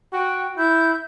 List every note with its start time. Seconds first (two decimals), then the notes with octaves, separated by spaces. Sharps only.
0.13 F#4 G5
0.57 E4 G6